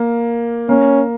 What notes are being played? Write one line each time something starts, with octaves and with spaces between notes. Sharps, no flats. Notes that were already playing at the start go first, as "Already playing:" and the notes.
Already playing: A#3
A#3 C#4